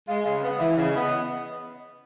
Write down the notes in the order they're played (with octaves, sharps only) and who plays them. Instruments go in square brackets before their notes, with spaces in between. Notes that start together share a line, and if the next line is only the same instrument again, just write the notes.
[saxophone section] G#3 [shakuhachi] F5
[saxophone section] C#3 [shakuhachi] F5
[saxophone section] B3 [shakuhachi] F5
[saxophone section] E3 [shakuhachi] E5
[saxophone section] C#3
[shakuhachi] D#5
[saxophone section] B3